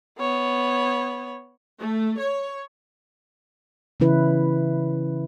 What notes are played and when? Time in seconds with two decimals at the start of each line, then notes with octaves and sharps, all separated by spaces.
0.19 B3 C#5
1.80 A3
2.20 C#5
4.00 C#3 E3 C#4 E4 B4